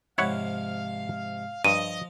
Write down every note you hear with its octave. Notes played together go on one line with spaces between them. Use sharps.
G#2 C3 F3 E4 C#5 F5 F#5
G2 F3 D#5 D#7